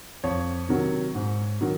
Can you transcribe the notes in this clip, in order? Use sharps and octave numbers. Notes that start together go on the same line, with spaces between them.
F2 C#5
C3 D#3 F#3
G#2
D#3 F#3